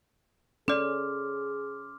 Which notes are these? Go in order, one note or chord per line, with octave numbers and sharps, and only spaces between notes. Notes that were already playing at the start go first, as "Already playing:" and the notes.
C#4 G#4 A4 D5 C6 D6 F6